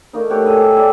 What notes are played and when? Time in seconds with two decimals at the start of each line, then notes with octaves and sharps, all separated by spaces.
0.13 A3 A#3 D#4
0.30 E4 G4 C#5 F#5
0.45 G#4 A4 D#5 B5
0.61 G4 E5
0.75 E4 G#4 D5 G5